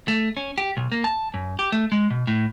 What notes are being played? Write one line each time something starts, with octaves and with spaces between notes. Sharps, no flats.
A3
C#4
G4
B1
A#3
A5
F#2
G4
A3
G#3
B2
A2